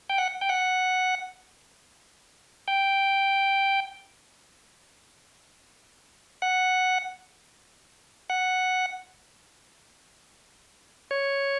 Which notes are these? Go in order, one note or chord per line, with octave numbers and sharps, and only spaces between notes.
G5
F#5
G5
F#5
G5
F#5
F#5
C#5